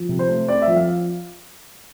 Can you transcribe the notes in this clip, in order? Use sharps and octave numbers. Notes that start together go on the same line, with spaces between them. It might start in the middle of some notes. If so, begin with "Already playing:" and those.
Already playing: F3
C3
C5
A3
C4 D5
E5
F3
F5